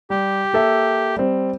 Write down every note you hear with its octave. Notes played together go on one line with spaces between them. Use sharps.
G3 G4
A#3 A4 E5
G3 C4